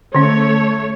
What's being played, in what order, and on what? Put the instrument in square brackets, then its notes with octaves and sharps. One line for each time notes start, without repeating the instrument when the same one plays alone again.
[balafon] D3 C#4 [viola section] A3 C#5